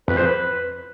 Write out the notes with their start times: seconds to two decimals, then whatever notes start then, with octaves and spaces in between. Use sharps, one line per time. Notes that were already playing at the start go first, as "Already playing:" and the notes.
0.08 F2 B4
0.17 C5
0.26 B4